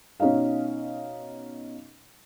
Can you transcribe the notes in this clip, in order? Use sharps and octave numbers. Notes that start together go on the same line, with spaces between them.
B2 C#4 D#4 D#5 F5